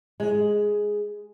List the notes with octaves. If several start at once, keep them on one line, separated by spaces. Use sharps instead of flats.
G#3